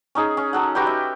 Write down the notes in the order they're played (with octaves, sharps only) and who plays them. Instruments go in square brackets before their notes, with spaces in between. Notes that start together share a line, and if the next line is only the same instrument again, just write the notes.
[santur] C#4 D#4 G#4
C#4
F#3 A4 F#5
F#4 G4 B4 G5
E5